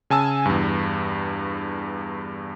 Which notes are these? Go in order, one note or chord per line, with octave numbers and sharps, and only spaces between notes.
C#3 G#5 A5 E6
E2 G2